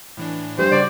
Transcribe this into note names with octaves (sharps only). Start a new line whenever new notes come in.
A2 E3 D4
G2 E3 F3 A3 C5
C#3 G3 F#4 D5